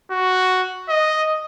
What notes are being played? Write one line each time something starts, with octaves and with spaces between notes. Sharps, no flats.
F#4
D#5